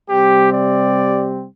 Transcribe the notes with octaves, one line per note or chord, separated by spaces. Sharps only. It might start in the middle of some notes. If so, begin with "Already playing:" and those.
C3 G3 C4 G4
D5